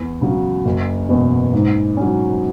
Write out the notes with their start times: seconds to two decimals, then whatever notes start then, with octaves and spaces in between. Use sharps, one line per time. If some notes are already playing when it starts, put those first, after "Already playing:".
Already playing: E2
0.21 C#3 F#3
0.65 F#1
1.09 E2 B2
1.53 G#2
1.97 F#3 C#4